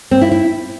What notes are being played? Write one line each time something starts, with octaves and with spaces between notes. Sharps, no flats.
C4
E4
E4